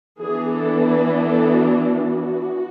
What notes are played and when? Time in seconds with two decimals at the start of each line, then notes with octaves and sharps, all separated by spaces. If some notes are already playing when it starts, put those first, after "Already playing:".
0.17 E3 B3 D4 G#4
0.51 A4
0.87 B4
1.22 A4
1.56 F#4